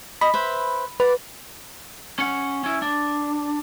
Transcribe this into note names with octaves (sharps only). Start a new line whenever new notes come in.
D#5 B5
B4 C5 E5
B4 D5 F#5
C#4 F#5
C#4 E4
D4